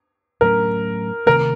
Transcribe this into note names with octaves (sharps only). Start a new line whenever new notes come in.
A2 F#3 A3 C#4 A#4
C3 D#3 A3 C4 A#4